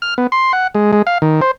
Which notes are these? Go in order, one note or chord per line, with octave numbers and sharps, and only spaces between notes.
F6
B3
C6
F#5
G#3
G#3
F5
D#3
C5